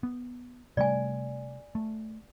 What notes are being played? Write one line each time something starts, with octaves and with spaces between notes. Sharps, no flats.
B3
C3 G3 A3 D5 G#5
A3